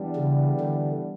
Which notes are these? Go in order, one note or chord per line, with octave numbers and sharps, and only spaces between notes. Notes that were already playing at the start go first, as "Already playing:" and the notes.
Already playing: E3 G3 B3 D4
C#3
D3